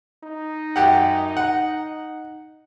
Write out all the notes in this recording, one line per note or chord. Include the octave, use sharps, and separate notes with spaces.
D#4
F#2 G4 F#5
F#5